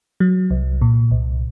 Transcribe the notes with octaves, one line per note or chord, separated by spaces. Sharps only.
F#3
C2
A#2
C2